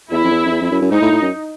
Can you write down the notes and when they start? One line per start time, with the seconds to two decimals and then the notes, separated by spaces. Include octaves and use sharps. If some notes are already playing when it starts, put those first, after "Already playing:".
0.11 E2 E4
0.24 F2
0.31 E2
0.46 F2
0.51 E2
0.61 F2
0.71 F#2
0.82 F#2
0.92 G#2 D#4
1.02 A2
1.12 A2
1.22 F#2